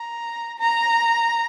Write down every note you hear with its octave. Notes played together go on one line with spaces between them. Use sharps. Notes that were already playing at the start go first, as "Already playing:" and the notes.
Already playing: A#5
A#5